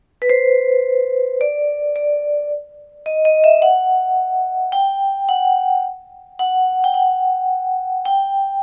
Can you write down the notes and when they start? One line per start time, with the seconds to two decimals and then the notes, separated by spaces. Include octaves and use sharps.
0.22 B4
0.30 C5
1.41 D5
1.96 D5
3.06 D#5
3.25 D#5
3.44 E5
3.62 F#5
4.72 G5
5.29 F#5
6.39 F#5
6.84 G5
6.94 F#5
8.05 G5